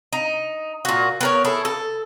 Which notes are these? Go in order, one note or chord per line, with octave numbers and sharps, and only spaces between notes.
D#4
A#2 F#4
B3 A#4 C#5
E4 G#4 A4
A4